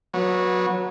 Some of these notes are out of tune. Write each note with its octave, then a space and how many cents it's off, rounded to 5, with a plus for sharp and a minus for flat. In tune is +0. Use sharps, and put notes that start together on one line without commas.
F#3 -15 B3 -30